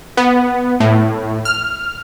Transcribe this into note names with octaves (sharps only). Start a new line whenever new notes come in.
B3
A2
F6